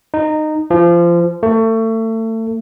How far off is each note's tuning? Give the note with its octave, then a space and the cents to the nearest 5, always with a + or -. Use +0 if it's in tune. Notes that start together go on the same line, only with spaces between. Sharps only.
D#4 -15
F3 -25
A3 +30